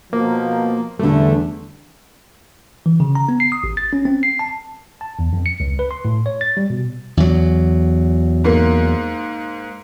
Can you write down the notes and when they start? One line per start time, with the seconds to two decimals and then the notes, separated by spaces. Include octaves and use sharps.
0.13 B2 F3 A#3
0.99 E2 D3 G3 A3
2.86 E3
3.00 C#3
3.15 A#5
3.29 B3
3.40 C7
3.52 D#6
3.64 A1
3.77 A6
3.93 C#4
4.05 C4
4.23 C7
4.39 A5
5.01 A5
5.19 E2
5.33 F2
5.46 C#7
5.60 C#2
5.79 B4
5.91 C6
6.05 A2
6.26 C#5
6.41 A6
6.57 G3
6.70 B2
7.17 E2 F#3
8.44 G#2 A#3